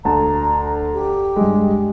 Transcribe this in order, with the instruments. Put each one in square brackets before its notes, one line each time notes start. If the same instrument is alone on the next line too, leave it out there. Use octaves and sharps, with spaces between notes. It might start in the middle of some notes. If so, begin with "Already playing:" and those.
[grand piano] D2 A5 [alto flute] A#5
[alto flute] G4
[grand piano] G2 G#3